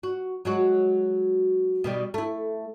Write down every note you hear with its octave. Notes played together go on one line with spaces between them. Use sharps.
F#4
F#3 G#3 F#4
B2 D#3 G3
A3 E4